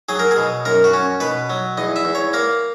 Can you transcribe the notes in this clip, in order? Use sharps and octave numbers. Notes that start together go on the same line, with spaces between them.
F#3 G#4
A#4
G#4
B2
F#2 A#4
F#4
C#4
B2 B4
F#3
E2 D#5
E5
E2
C#5
A#3 A#4